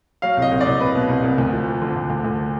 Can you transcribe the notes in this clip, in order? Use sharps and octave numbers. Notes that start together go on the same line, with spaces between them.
F#3 F5
C2 D#5
C2
D5
C2
C2 B4
B2
C2
C2
D2
F3
F3
D3
D2
D2
D2